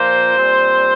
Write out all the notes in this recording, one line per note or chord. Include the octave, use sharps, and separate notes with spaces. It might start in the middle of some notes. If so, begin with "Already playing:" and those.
Already playing: A#2 F3 A#3 C5
A#2 G3 C4